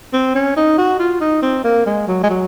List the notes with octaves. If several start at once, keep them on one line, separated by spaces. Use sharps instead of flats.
C4
C#4
D#4
F#4
F4
D#4
C4
A#3
G#3
F#3
G#3
F#3